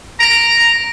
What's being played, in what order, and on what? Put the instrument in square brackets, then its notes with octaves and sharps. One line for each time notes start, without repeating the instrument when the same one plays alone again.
[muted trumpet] A#5 [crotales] A#6 D7